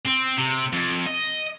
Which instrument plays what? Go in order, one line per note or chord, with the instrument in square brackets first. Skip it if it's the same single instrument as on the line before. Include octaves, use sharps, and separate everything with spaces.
[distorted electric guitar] C4
C3
F2
D#5